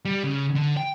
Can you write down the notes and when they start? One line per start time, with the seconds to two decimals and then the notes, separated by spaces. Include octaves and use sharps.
0.05 G3
0.24 C#3
0.55 D3
0.77 G5